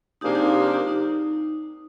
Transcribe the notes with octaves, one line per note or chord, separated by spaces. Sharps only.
C3 F3 A#3 D4 D#4 G4 G#4
D#4 G4
F4
F4
D#4 G4
D#4